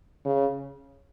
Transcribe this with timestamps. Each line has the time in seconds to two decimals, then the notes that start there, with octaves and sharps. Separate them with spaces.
0.25 C#3